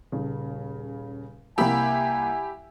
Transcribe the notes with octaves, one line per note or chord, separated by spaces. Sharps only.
D#1 C#3
C2 A#3 G4 E5 G#5 B5